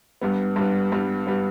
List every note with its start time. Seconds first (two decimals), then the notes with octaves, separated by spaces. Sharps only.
0.21 G2 G3 B3
0.56 G2 G3 B3
0.92 G2 G3 B3
1.27 G3 B3